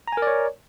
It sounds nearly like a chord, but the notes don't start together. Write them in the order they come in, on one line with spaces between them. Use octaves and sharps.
A#5 G#5 A#4 D5 C#5